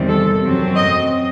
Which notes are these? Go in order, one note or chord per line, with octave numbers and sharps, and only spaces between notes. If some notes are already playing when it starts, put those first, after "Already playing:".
Already playing: E2 C3 D#3 G3 C4
A4
F#2 F#3 C4
D#5